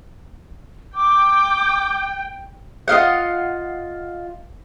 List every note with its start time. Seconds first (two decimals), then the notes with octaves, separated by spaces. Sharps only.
0.94 G5 D6
2.88 F4 D#5 F5 F#5